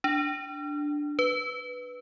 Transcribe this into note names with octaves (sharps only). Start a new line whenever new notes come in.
D4
B4